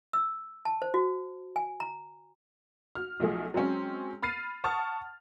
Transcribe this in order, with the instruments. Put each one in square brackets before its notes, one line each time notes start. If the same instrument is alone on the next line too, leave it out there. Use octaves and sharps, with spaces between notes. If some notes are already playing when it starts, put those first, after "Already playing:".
[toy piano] E6
A5
C5
F#4
G#5
A#5
[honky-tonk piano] F#4 F6
B1 F3 A3 G#4
F#3 G#3 C4 C#4
B5 F6 A6 C7 D#7
F#5 A5 C#6 D#6 F6 A6